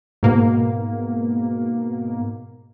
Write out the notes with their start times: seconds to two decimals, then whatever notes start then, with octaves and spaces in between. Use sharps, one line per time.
0.23 G#2 B2 A#3